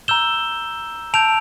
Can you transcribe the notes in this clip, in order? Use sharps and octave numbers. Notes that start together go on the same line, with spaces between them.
A#5 E6 G6 E7 G7
A5 E6 G6 D7 F7